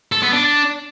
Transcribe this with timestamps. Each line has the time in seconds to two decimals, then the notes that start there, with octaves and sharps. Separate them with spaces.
0.12 A4
0.23 B3
0.33 D4
0.44 D4